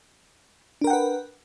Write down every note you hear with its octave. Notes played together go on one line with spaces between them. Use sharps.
D4 A#4 B4 F#5 G5